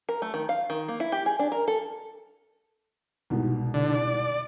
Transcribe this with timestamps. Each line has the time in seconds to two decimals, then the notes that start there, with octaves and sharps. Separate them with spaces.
0.09 A#4
0.22 A3
0.34 D#3
0.49 F5
0.70 D#3
0.88 A#3
1.00 E4
1.12 G4
1.26 G#4
1.39 D4
1.52 A#4
1.68 A4
3.30 C2 G#2 B2
3.74 D3
3.96 D5